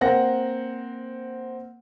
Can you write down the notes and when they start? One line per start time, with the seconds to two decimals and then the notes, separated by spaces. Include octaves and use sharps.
0.01 A#3 C4 F#5 A#6